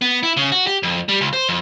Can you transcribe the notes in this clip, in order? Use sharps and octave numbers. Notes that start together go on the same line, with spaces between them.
B3
E4
C#3
F#4
G4
F2
G3
C#2
C5
F2